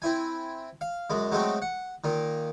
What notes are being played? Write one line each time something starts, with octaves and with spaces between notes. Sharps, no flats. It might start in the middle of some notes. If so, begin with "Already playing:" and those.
C4 E4 G#5
F5
F#2 G#3
F#3 G#3 A3 C4
F#5
A#2 D#3